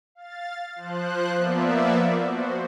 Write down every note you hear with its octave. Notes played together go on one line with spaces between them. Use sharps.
F5 A6
F3 C5 F#6
F3 A#3 B3 D5 E5
F#4 C5